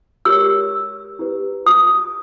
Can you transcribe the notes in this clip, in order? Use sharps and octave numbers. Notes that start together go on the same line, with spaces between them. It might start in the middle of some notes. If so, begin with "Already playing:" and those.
G4 A#4 C#5 E6
E4 G4 B4
D#6